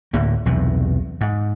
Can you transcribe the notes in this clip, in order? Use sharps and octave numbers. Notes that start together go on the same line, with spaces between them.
D2 A2 D3 A#3
B1 E2 G2 C3
G#2